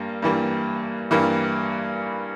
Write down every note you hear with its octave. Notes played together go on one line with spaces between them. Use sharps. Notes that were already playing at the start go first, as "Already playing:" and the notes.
Already playing: G2 G3 A#3
G2 E3 G3 A#3
G2 E3 G3 A#3